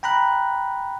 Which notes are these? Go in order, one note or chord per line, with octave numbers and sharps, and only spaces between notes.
G5 A#5 B5 F#6